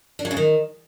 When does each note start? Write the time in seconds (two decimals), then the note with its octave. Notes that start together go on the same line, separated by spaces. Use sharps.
0.19 D4
0.25 F#3
0.31 C#3
0.37 D#3